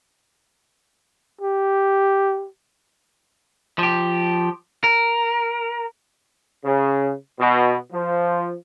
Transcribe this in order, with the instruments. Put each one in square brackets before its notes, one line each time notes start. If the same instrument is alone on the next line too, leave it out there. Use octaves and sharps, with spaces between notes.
[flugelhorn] G4
[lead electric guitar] F3 G4
A#4
[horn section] C#3
B2
F3